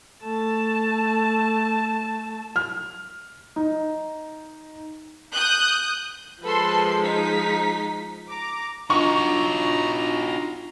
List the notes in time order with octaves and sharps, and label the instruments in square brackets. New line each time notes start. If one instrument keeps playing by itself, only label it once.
[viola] A3 A5
[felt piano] F6
D#4
[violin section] D#6 F#6 G6
[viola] F3 G#3 [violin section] A4 B4 C6
[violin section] D#4 B6
[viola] A#5 [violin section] D6
[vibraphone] D4 F4 D#5 [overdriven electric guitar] D#4 F#4 [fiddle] A#5 [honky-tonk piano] C#6